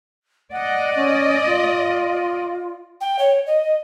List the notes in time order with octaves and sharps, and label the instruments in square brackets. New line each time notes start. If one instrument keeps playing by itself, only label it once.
[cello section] D5 D#5 [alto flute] F#5
[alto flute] C#4
F4
[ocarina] G5
C#5
D#5